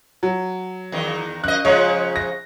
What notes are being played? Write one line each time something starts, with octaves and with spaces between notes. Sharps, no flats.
F#3
E2 D#3
F#2 D#5 F#6
C#3 F3 G#3 C#5 D#5
A#6